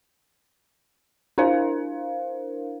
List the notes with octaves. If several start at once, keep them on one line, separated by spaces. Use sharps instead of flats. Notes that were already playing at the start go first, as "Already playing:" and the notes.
D4 E4 A#4 C5 F5